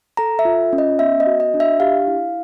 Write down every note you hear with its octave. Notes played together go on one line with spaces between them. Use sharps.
A4 A#5
E5
F4
C#4
D#5
B3 E5
D#5
F#4
D#5
D4
E5
G4 F5
E4